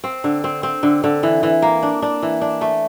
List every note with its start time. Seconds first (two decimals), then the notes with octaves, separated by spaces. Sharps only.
0.04 C4
0.24 D3
0.44 C4
0.63 C4
0.83 D3
1.04 D3
1.23 E3
1.43 E3
1.62 A#3
1.83 D4
2.02 D4
2.23 E3
2.41 D4
2.61 A3